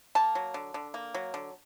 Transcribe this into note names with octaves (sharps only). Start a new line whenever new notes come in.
A#3 A5
F#3
D3
D3
A#3
F#3
D3